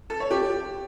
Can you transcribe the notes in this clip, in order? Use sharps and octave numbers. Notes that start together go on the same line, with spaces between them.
A4
C#5
G4